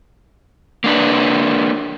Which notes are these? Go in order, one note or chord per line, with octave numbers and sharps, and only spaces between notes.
A#3 D4 B4